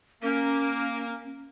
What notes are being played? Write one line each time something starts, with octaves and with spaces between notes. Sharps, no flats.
A#3 C#4